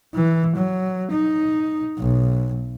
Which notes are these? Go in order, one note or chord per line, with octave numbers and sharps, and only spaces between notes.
E3
F#3
D#4
B1